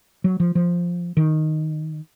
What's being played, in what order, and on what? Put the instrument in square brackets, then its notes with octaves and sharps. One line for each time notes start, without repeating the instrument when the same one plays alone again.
[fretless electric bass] F#3
F3
F3
D#3